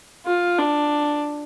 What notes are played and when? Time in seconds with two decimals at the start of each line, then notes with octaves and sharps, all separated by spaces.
0.26 F4
0.59 D4